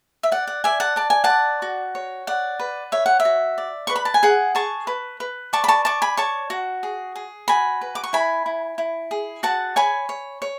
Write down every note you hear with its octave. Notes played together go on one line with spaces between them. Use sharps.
E5
D5 F#5
F#5
D5 E5 G#5
F#5 A5
D5 A5
G#5
F#5 A5
D5
F#4
C#5
D5 F#5
B4
C#5 E5
F#5
E5
F#4
D5
B4 C#6
B5
A5
G#5
G#4 F#5
G#4 A5 C#6
B4
B4
D5 A5 C#6
B5
A5 C#6
D5 A5 C#6
G#5 B5
C#5 A5 C#6
F#4
G#4
G#4
F#4 G#5 B5
B4
D6
C#6
E4 G#5 B5
E4
E4
G#4
F#4 F#5 A5
C#5 G#5 B5
C#5
C#5